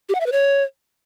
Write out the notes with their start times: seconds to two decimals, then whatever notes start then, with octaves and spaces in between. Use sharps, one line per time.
0.09 G4
0.15 F#5
0.21 E5
0.26 B4
0.32 C#5